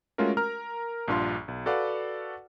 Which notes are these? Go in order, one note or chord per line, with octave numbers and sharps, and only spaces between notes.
G#3 A3 C#4 F4 F#4 A#4
A#4 A#5 F6
A#1 G2 D4 F4 C6
B1
F#4 A4 B4 D5 F5 F#5